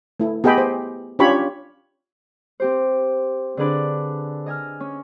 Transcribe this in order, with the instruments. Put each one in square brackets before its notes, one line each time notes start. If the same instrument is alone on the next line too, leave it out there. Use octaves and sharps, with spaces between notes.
[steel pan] A3 E4
B3 G4 G#4 D#5 G5 B5
C5
C#4 D4 F4 G4 C#5 B5
[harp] C4 G4 C5
D3 C4 D4 G#4 B4 D5
D#5 G#5 E6 F6
C#4